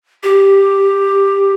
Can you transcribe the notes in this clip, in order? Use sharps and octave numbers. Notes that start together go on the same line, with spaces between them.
G4